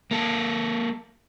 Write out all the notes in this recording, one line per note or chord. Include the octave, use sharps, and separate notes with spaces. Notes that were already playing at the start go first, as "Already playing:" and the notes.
A#3 A4